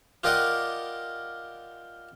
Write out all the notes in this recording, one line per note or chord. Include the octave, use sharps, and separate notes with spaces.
F4 G4 A#4 D5 D#5 F#5